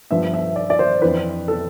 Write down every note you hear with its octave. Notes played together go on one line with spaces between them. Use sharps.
G2 F3 B3 E5
E5
D5
D5
C5
F2 E3 B3 D4 B4
A4